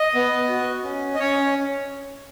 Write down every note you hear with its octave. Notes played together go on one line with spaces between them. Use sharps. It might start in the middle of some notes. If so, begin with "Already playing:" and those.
Already playing: D#5
B3
F#4
C#4
D#5
C#4 C#5